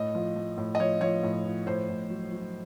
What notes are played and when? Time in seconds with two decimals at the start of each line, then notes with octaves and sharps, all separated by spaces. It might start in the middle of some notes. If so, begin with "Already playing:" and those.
Already playing: A2 D#5
0.15 F3
0.36 F3
0.57 A2
0.75 D#5
0.80 F3 C#5
1.01 F3 C#5
1.23 A2
1.45 F3
1.66 A2 C5
1.89 A2
2.10 F#3
2.32 F#3